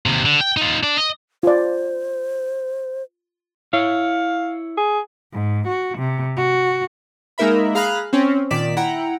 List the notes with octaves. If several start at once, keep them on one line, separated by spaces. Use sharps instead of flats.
D#2 C3
D3
G5
D#4 F4
D4 D5
D#5
F4 C5 D5
E4 C#5 F5
G#4
G#2
F#4
C3
F#4
G#3 A#3 D#4 A#4 E5 B5
G#4 F5 A#5 B5 F6 F#6
C4 C#4
A#2 D#3 D5 B6 E7
E4 F#5 G5 A#5